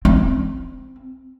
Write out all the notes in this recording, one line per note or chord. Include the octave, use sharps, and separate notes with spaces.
C4